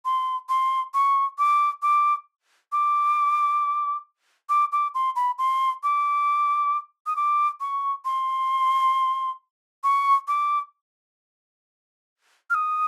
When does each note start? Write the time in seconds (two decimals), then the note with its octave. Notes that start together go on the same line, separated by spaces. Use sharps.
0.05 C6
0.49 C6
0.94 C#6
1.38 D6
1.83 D6
2.72 D6
4.49 D6
4.72 D6
4.95 C6
5.16 B5
5.38 C6
5.83 D6
7.07 D#6
7.17 D6
7.61 C#6
8.05 C6
9.84 C#6
10.28 D6
12.50 F6
12.54 D#6